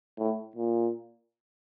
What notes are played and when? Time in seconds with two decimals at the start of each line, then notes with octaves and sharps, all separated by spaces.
0.18 A2
0.56 A#2